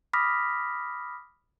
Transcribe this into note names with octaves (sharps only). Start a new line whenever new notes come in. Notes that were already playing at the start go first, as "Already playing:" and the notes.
B5 D6 D#6 F6 A#6 B6